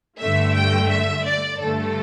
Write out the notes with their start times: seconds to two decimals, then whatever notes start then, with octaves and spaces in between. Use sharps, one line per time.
0.19 G2 D3 A3 E5
0.54 G5
0.89 E5
1.24 D5
1.60 G2 D3 A3 A4